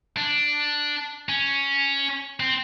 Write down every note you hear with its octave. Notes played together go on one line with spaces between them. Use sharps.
D4
C#4
C4